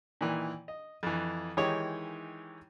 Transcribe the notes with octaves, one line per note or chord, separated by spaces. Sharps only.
A#2 D#3 E3
D#5
F2 E3
D#3 E3 G#3 D#4 G4 C#5